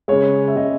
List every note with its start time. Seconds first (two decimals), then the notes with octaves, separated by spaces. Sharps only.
0.08 C#3 G#3 C#5
0.48 E5
0.56 C#3 G#3 D#5